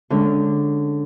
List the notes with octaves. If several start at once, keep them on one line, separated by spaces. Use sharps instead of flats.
D3 G#3 C#4 D4